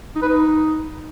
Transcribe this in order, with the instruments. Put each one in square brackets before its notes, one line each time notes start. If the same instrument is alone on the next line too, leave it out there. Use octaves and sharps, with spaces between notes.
[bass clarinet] D#4
B4
D#4